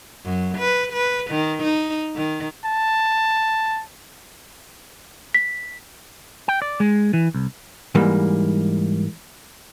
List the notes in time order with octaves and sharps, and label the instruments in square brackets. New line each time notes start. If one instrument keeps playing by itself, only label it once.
[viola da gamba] F#2
B4
B4
D#3
D#4
D#3
[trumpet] A5
[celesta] B6
[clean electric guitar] G5
D5
G#3
E3
C2
[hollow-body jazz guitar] G#2 E3 G3 A#3